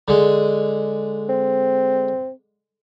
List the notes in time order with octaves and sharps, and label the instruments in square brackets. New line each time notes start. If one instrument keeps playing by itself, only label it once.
[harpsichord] D3 G#3
[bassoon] C4